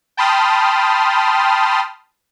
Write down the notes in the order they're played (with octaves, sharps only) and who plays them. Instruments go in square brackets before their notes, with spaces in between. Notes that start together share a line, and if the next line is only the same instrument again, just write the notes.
[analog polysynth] G5 A5 B5 C6 D#6 F6